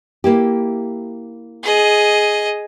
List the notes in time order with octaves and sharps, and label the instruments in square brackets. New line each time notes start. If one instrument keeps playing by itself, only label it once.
[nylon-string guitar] A#3 E4 G4
[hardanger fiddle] G#4 D#5